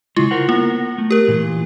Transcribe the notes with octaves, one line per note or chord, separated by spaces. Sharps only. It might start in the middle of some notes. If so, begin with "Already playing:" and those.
C#3 G#3 E4 F4
A#4 C5 F#5
A#3 B3 A#4
A3
G4 A#4
A#2 E3 F4